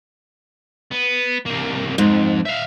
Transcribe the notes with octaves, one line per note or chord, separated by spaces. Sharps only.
B3
C2 A#3
F2 G#2
E5 F5